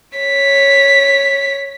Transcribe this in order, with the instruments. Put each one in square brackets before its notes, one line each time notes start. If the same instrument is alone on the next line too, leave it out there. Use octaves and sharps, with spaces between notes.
[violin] C#5 B6